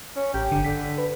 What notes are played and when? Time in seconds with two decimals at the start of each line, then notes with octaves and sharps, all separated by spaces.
0.16 C#4
0.34 A1 G4
0.52 G1 D3
0.65 D3 B6
0.98 B4